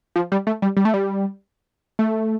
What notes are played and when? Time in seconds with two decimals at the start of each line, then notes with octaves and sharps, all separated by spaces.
0.16 F3
0.32 G3
0.47 A3
0.62 G3
0.77 G3
0.85 A3
0.94 G3
1.99 A3